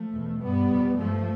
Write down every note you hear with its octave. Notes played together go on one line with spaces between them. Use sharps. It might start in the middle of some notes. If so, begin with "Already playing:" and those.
Already playing: F3 A3
E2 B2
G2 G3 B3
F2 C3
G2 F3 A3